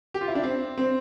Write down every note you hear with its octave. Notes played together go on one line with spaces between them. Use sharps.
G4
F4
E4
D4
C4
C4